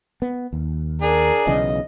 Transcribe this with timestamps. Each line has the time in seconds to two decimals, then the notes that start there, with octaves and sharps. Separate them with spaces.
0.22 B3
0.53 D#2
1.02 D4 G#4 A#4
1.47 B1 C#3 E3 D#5